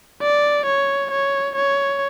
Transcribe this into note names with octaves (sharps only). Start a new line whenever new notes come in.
D5
C#5
C#5
C#5